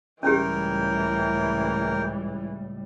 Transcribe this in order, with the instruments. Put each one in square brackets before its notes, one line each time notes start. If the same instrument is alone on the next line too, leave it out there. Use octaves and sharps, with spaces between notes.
[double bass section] C#2 A2 G3 [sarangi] E3 [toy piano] C#4 G4 [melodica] A#4 G5